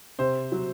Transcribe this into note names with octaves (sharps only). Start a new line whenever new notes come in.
C3 C5
F#3